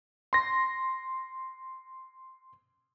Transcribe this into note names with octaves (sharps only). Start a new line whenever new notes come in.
C6 A#6